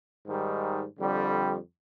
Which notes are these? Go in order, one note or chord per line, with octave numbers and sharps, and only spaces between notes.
G#2 D#3 G3
F2 D3 G3